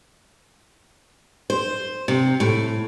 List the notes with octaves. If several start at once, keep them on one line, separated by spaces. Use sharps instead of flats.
C5
C3
A2